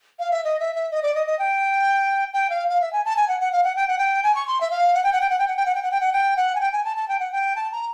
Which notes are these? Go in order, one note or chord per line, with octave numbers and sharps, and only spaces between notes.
F5
E5
D#5
E5
E5
D#5
D5
D#5
D#5
G5
G5
F5
F5
E5
G#5
A5
G#5
F#5
F#5
F5
F#5
G5
F#5
G5
G#5
C#6
C6
E5
F5
F#5
G5
F#5
G5
F#5
G5
F#5
G5
F#5
G5
F#5
G5
F#5
G5
F#5
G#5
G5
G#5
A5
A5
G5
F#5
G5
A5
A#5